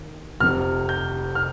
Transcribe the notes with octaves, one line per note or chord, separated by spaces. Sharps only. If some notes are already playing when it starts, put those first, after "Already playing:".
Already playing: D#2 D#3
F1 F2 C3 F6
G6
F6